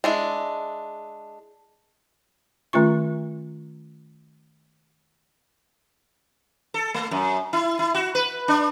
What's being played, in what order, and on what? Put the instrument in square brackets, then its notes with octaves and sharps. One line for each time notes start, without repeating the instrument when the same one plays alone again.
[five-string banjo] G#3 D4 E4
[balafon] D#3 A3 C#4 F4 C#6
[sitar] A4
A3
F#2
E4
E4
F#4
B4
D4